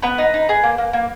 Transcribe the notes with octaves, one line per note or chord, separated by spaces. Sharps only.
B3 B4
D#4
D#4
G#4
A#3
A#3
A#3